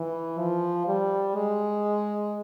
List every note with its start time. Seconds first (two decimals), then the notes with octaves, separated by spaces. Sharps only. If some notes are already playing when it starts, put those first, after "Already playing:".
Already playing: E3
0.38 F3
0.87 G3
1.35 G#3